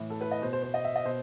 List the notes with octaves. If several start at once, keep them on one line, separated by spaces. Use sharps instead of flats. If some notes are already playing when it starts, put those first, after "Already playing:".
Already playing: A2 E3
A4
B4
D#5
B2 C5
C5
C5
D#5
E5
D#5
B2 C5